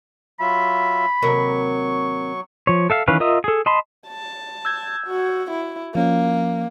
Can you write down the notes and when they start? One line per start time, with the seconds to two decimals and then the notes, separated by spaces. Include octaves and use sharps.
0.40 F#3 F4 E5 B5
1.22 D#2 C3 F#3 A#4 C#6
2.67 F3 C#5
2.90 A4 E5 F5
3.08 D#3 E3 C#4 B4 F5
3.20 F4 A#4 D#5 E5 D#6
3.44 G#4 A4
3.66 D#5 A5 B5 C6
4.08 A5
4.65 E6 G6 G#6
5.07 F#4
5.51 E4
5.95 F3 A#3 C#4